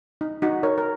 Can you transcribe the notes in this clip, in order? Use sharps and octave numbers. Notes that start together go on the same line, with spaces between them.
D#4
D#4 F#4
A#4 C#5
A#4